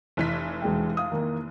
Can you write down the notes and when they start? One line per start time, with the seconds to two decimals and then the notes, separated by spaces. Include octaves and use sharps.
0.17 F1 E3 B6
0.62 E1 G#3 G5
0.97 F5 D#6
1.12 D#3 A#3